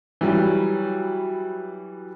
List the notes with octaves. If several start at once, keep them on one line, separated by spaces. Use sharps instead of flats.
E3 F#3 G3